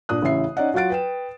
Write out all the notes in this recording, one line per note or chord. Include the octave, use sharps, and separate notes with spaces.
A#2 D4 D#6 F#6
A1 C#3 E3 E5 C7
C#4 D#4 D5 D#5 F#5
F#3 F4 F#4 F#5 A6 D7
B4 G5 E7